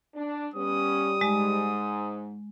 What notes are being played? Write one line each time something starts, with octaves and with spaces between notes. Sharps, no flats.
D4
G3 B3 C#4 D#6
G#2 G#3